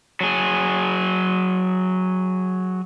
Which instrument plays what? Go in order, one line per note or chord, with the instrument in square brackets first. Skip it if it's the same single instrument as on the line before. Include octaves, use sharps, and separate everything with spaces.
[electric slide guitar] F#3 G#4